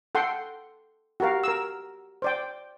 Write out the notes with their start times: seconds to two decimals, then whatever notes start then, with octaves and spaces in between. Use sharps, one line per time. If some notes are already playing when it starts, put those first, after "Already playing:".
0.15 A4 F#5 G5 C6
1.20 F#4 G4 A#4 F5
1.44 A#4 E6
2.22 C5 D5 G5